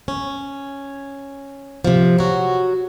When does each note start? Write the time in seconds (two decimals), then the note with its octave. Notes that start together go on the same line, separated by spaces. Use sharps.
0.08 C#4
1.84 C3 F3
2.18 F#3 F#4